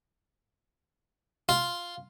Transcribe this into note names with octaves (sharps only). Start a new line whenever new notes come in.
F4